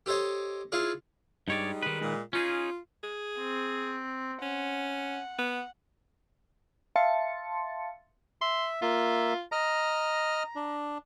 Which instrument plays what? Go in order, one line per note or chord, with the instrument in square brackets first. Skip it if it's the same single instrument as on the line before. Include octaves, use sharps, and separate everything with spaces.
[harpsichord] G4 A4 C5 C#5 D#5
E4 F4 G#4 C#5
[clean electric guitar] G2 C#5 D5 [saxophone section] G3 G#3 D#4
[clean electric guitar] D#3 B4
[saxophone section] A#2 G#3
[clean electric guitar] C#4 D#4 G#4 [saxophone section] F4
[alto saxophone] G#4
[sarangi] C4
[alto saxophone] C#4 [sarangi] F#5
[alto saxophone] B3
[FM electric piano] E5 F5 A5 C6 A6 C#7
[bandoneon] E5 [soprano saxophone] C6
[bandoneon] A#3 E5 [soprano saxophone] F4
[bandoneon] D#5 F6 [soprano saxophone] A#5
[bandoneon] D4